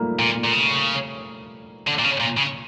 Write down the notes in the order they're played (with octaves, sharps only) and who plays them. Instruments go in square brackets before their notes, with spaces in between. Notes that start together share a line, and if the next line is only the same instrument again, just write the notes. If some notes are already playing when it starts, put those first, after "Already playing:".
Already playing: [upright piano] F3 G3 A3 A#3
[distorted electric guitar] A#2
A#2
C#3
D3
A#2
C#3
A#2
C#3